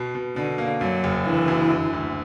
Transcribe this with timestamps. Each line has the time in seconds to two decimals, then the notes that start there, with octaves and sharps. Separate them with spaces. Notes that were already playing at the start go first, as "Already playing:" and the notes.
Already playing: B2
0.15 B2
0.36 B2 D3
0.58 A#3
0.81 F#2 F#3
1.04 F#1
1.25 D3 E3
1.48 F#2
1.70 D3
1.93 D2